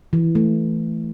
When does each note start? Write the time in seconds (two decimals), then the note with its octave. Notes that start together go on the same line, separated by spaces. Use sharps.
0.13 E3
0.35 A3